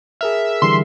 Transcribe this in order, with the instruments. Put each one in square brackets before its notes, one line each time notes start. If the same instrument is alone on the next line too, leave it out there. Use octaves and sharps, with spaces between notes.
[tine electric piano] G#4 A#4 F6 [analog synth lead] E5
[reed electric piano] D3 E3 G3 [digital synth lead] C6